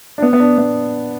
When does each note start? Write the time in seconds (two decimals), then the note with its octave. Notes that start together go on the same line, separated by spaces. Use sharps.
0.18 D4
0.22 B3
0.33 B3
0.40 D4
0.58 B3